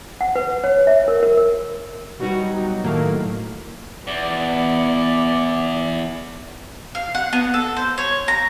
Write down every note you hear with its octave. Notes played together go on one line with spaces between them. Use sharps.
F#5
B4
C#5
E5
A#4
A#4
A#4
B2 F#3 G3 D#4 F#4
A2 D#3 F#3 A3 A#3
E2 B3 D5
F5
F#5
B3
A4
C5
C#5
A#5